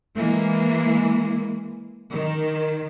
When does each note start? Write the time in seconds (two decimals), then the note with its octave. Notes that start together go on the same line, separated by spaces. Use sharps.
0.16 E3 G#3 A#3
2.13 D#3